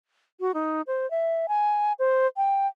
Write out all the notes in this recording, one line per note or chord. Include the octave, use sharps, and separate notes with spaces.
F#4
D#4
C5
E5
G#5
C5
G5